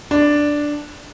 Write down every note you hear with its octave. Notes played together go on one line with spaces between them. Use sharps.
D4